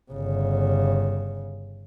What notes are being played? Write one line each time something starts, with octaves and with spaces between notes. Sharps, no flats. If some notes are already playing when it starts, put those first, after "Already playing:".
G1 C#3